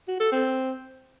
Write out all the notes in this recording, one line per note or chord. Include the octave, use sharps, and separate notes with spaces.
F#4
A4
C4